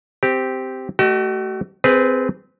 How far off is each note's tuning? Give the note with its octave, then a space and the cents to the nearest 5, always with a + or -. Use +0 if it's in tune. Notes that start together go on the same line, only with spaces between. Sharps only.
C4 -10 G4 +0
A3 +0 F#4 +45 D#5 -35
C4 -20 G#4 -5 B4 +0